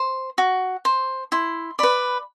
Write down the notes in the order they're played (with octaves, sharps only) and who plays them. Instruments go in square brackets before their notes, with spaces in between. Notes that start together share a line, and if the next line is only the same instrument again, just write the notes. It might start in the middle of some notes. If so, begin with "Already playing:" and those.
Already playing: [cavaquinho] C5
F#4
C5
E4 C6
B4 D5 B5